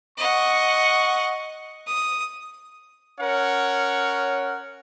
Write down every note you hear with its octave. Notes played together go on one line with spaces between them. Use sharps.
D#5 F#5 C#6
D#6
C#4 A#4 C#5 F#5